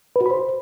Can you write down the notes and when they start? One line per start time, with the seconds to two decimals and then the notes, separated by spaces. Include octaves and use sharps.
0.16 B4
0.21 F#4
0.26 B5
0.31 C5